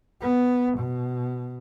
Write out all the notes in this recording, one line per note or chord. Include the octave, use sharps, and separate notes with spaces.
B3
B2